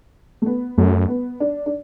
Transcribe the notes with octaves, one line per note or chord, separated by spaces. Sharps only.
A3
B3
F#2 A3
B3
D4
D4